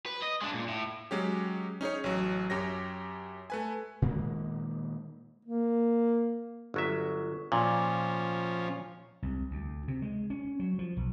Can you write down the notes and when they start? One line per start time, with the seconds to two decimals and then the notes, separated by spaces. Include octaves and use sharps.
0.06 B4
0.22 D#5
0.41 G#3 D4
0.54 A#2
0.68 A2
1.11 F#3 G#3 C#4 G4
1.81 C#4 D#4 G#4 C#5
2.04 A1 F#3
2.50 F#2 G4 C#5 A#6
3.50 A3 B4 G#5
4.02 A#2 D#3 G#3 A#3
5.45 A#3
6.74 G1 F#3 E5
7.52 A#2 F3 C#4
9.22 C2
9.51 D2
9.88 C3
10.02 G#3
10.30 C#4
10.60 F#3
10.79 F3
10.97 B1